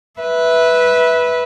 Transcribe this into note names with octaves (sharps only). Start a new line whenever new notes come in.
B4 E5